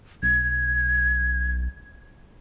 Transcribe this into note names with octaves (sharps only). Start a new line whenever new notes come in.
B1 G#6